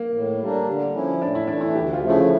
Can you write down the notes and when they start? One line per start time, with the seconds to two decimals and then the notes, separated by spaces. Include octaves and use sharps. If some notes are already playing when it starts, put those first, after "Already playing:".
Already playing: A#3
0.13 A2
0.41 G3 A#3 D4
0.67 D3
0.94 F3 C#4 E4
1.21 A2 D4
1.35 E4
1.47 E3 A3 D4
1.61 E4
1.75 D2 G4
1.93 F4
2.02 C#3 F3 A3
2.10 E4